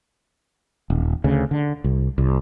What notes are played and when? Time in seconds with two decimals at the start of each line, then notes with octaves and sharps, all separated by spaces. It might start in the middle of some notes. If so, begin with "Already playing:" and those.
0.90 D#1
1.24 D2 C#3
1.51 D3
1.84 C2
2.18 C2